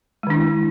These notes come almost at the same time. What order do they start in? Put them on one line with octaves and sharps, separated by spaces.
G#3 D#3 D4 E4